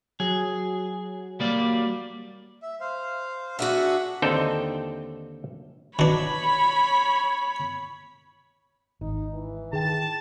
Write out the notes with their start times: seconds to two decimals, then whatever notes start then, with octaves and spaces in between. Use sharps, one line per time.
0.20 F#3 G#4
1.40 G3 A#3 D5
2.62 E5
2.80 C5 F5
3.59 D4 F#4 G#4 E5 F#5 E6
4.22 D#2 D3 C4 D#4 A4 G5
5.99 B2 D4 C#5 B5
9.01 G#1 D#4
9.33 E3
9.73 D#3 G#4 G5 A5